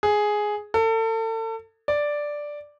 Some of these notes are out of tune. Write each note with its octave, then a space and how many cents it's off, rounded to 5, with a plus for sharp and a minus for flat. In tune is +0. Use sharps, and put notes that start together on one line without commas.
G#4 +5
A4 +35
D5 +0